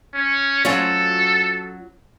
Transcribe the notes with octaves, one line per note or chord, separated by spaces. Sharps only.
C#4
F#3 C#4 F4 A4